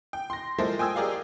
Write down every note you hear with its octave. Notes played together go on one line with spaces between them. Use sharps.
G5
C6 A#6
F3 G#3 A#3 E4 A4 C5
G5 G#5 D#6 E6 G#6
G4 G#4 A#4 D5 D#5 F5